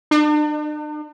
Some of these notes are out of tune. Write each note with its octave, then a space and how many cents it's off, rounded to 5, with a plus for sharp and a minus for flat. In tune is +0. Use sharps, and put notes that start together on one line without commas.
D4 +40